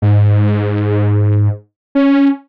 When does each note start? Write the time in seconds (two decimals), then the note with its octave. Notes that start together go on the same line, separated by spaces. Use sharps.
0.02 G#2
1.95 C#4